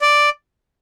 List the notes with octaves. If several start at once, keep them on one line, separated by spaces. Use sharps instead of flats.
D5